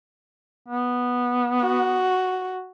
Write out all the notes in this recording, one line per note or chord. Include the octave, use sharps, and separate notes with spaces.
B3
F#4